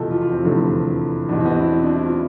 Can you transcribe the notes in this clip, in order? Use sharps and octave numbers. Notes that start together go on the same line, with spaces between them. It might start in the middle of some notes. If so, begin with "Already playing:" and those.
Already playing: F1 E2 B2 F4 G4 A4
F4
F4
C4
F1 E2 D3 F3
E2 B2 D4
C4
B3
C4
E4
C4
D4
E4
F4